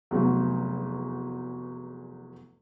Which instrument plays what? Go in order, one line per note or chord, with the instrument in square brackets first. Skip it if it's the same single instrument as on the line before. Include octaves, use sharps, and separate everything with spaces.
[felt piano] F1 E2 F#3